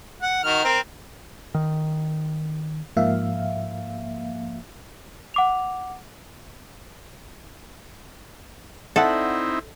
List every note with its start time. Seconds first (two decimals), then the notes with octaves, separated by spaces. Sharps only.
0.22 F#5
0.43 D#3 F#4 F6
0.64 C4 A#4
1.55 D#3
2.97 G#2 F3 A#3 E5 F5
5.34 F#5 D6 F7
8.96 C4 D#4 E4 A4 D5 E5 F#5